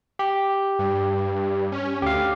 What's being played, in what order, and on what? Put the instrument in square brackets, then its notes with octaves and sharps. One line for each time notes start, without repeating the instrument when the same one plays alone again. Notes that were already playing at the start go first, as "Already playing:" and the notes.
[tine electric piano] G4
[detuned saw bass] G2
C#4
[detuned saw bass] D2 [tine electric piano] G4 F5